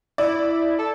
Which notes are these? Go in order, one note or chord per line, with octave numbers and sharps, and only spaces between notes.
E4 D5
A4